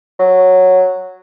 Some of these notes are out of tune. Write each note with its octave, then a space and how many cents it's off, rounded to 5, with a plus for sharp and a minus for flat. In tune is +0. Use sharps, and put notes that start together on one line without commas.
F#3 -5